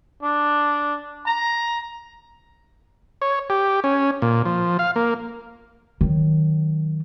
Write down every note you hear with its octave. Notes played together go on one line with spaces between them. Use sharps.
D4
A#5
C#5
G4
C#4
A#2
F3
F5
A#3
D#3 F#3